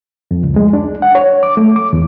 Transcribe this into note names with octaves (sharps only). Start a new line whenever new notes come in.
F2
C#2
G#3
D4
F#5
C#5
D6
A3
D6
E2